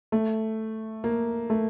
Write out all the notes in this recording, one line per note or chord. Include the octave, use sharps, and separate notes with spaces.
A3
A#3
A3